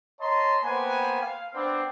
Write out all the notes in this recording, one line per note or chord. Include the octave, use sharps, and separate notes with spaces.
C#5 D#5 A5 A#5 C6
A#3 B3 B4 C5 G5 G#5
F5
B3 C4 D4